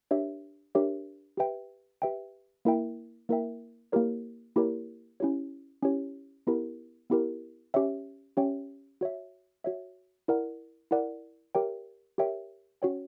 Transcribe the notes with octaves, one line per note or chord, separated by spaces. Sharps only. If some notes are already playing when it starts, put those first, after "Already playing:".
D4 G4 A#4 C#5 E5
D4 G4 A#4 C#5 E5
G4 B4 E5 G5
G4 B4 E5 G5
A#3 E4 A#4 E5 G5
A#3 E4 A#4 E5 G5
A#3 E4 G4 A#4 C#5
A#3 E4 G4 A#4 C#5
C#4 E4 G4 C#5
C#4 E4 G4 C#5
B3 E4 G4 A#4
B3 E4 G4 A#4
C#4 G4 C#5 E5 G5
C#4 G4 C#5 E5 G5
F#4 C#5 E5
F#4 C#5 E5
E4 A#4 D5 F#5
E4 A#4 D5 F#5
G4 A#4 C#5 E5 G5
G4 A#4 C#5 E5 G5
C#4 F#4 C#5 G5